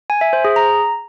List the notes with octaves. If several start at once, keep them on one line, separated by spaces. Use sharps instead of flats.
G#5
E5
C5
G#4
A#5